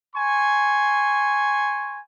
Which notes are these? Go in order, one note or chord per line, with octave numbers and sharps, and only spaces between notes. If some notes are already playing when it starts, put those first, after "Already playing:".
G#5 C6 C#6